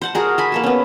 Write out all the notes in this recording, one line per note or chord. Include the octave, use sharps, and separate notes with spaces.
C5 F#5 A5
F#4 G#4 A#4
A4 G#5 B5
A#3 A4 A5
B3 C#4